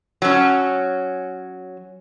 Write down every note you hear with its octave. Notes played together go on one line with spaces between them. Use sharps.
F#3 C#4